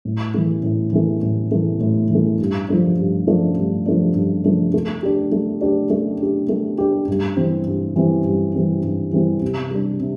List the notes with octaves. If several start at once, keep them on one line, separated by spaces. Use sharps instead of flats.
A2
E3 A3
A2
E3 A3
A2
E3 A3
A2
E3
A3
G2
F3 A3 D4
G2
F3 A3 D4
G2
F3 A3 D4
G2
F3 A3 D4
A3
D4 G4
A3
D4 G4
A3
D4 G4
A3
D4 G4
G2
E3 G3 C4
G2
E3 G3 C4
G2
E3 G3 C4
G2
E3 G3 C4
C3
G3 D4
C3